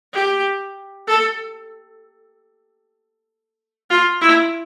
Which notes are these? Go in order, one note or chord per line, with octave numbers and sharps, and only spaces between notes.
G4
A4
F4
E4